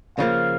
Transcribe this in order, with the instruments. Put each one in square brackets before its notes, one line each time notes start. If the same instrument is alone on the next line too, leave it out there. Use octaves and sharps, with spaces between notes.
[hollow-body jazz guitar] C#3 F3 A#3 [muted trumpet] F5